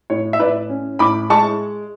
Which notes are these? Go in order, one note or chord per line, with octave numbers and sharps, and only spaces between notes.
A2 C#5
E5
A2 B4 D5
C#4
A2 B5 D6
G#3 A5 C#6